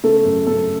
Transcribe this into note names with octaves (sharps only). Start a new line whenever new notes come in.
C#3 A3 A4
F#2
F#2 A3 A4